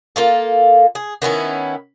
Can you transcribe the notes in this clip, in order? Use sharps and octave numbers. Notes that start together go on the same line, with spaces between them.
A#3 F4 A4
G#4
D#3 B3 C#4 E4